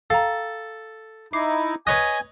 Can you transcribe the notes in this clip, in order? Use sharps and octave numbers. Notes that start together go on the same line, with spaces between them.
A4 F5 G5 A#5
D#4 E4 D6 C7
B4 C#5 D#5 G#5 F#6